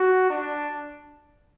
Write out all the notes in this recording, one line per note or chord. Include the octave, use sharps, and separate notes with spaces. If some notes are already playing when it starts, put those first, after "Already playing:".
Already playing: F#4
D4